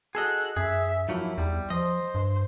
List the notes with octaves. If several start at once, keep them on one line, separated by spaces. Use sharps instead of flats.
F#4 G#4 A4 D#5 F#6
F#2 G#4 E5
F3 F#3 A#3 D#4 E4
E2 G3
F3 C5 D#5
G2